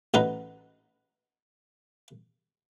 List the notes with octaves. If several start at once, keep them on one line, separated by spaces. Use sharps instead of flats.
A1 F#3 D#4 B4 A#5